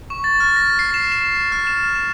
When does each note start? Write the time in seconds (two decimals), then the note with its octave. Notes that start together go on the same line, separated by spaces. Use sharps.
0.10 C#6
0.24 A6
0.40 F6
0.56 A#6
0.79 C7
0.94 E7
1.12 E7
1.52 F6
1.67 E7
1.95 E7